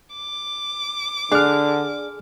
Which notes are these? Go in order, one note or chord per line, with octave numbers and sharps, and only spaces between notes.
D6
D3 D4 G#4 F6